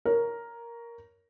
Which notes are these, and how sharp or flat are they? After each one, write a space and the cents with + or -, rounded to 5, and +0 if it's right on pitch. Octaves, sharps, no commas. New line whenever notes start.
A#4 +5 C#5 +20